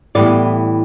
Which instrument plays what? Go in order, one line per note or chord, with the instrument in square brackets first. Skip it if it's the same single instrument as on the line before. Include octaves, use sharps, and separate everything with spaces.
[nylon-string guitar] A2 E3 G3 B3 D5